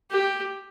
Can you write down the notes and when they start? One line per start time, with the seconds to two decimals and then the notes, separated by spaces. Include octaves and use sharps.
0.11 G4